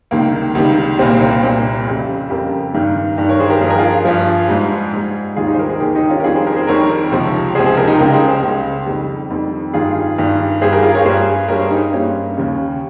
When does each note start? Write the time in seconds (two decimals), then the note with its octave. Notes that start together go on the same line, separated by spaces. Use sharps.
0.11 C#2 C3 D#3 G3 A#3
0.55 C#2 C3 D#3 G3
0.99 C2 A#2 G3 C4
1.10 A#3
1.21 C4
1.32 A#3
1.43 C2 A#2 G3 C4
1.87 F2 C#3 G3
2.30 F2 C#3 G3 G4 A#4
2.74 G2 D#3 G3
3.18 G2 D#3 G3
3.29 A#4 C#5
3.40 G#4 C5
3.50 G4 A#4
3.61 G2 F3 G#4
3.70 A#4
3.78 F4 G#4
4.05 G2 F3
4.49 G#2 G3
4.93 G#2 G3
5.36 D#2 D#3 G3 F4 G#4
5.48 D#4 G4
5.54 C5
5.58 G4 A#4
5.69 G#4 C5
5.80 D#2 D#3 G3 G4 A#4
5.95 D#4 G4
6.09 C#4 F4
6.20 A#4
6.24 F2 D#3 G3 F4 G#4
6.35 G#4 C5
6.47 G4 A#4
6.56 G#4 C5
6.67 F2 D#3 G3 A#4 C#5
7.11 C#2 C3 F3
7.55 C#2 C3 F3 G#4 C5
7.66 G#4 C5
7.77 G4 A#4
7.88 D#4 G4
7.99 C#2 C#3 G3 G4 A#4
8.13 G#4 C5
8.28 G#4 C5
8.42 C#2 C#3 G3
8.86 F2 D#3 G3
9.30 F2 D#3 G3
9.74 G2 D#3 G3 F4 G#4
10.18 G2 D#3 G3
10.61 G2 G3 G#4 C5
10.73 G4 A#4
10.83 F4 G#4
10.95 A#4 C#5
11.05 G2 G3 G#4 C5
11.49 G2 G3 A#4 C#5
11.59 G#4 C5
11.71 D#4 G4
11.93 G2 G3 A#3 C#4
12.37 D#2 C#3 G3